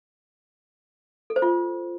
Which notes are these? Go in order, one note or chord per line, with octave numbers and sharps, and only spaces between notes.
A4
C5
F4